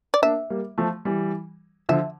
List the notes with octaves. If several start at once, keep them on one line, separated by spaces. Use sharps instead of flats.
D5
A#3 D4 E5
G3 A#3
F3 A3
E3 G3
D3 F3 E5